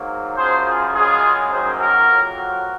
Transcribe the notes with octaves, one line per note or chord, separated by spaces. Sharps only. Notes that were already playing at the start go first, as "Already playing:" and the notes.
Already playing: G#2 F#3 A#3
F#2 C#3 F3 G#4 C5
F4 G#4
F#2 C#3 G#3 F4 G#4
F#2 D#3 F#3 A#3 G#4 C5
F#4 A#4
F2 C3 F#3 A#3
F#4 A#4